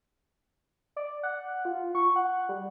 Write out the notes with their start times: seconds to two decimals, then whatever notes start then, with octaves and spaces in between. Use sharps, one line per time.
0.96 D5
1.23 F#5
1.65 F4
1.95 C#6
2.16 F#5
2.49 G3